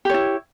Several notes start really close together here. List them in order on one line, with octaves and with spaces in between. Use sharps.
G4 C#5 E4